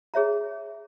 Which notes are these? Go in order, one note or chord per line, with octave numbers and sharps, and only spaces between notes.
G#4 C#5 E5 A#5